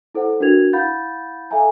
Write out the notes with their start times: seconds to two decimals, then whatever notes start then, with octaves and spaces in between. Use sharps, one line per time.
0.15 E4 A4 C5 F#5
0.40 D4 F#4 A#4 B4 G#6 F7
0.73 E4 F5 F#5 B5 G6 A6
1.51 A4 E5 F5 G#5 A#5